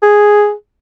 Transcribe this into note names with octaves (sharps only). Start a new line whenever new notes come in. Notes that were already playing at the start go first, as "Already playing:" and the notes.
G#4